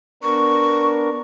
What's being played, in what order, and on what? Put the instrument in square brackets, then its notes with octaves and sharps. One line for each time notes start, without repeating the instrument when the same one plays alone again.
[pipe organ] B3 D4 A#4 [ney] C#6